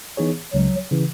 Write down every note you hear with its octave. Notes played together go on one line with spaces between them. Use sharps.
E3 B3 D#4 G#4 C#5
C#2 C#3 F#3 G#3
C#3 E3